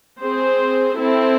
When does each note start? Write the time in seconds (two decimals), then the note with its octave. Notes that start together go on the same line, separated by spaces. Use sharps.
0.21 C4 G#4 C5
0.97 C4 E4 A4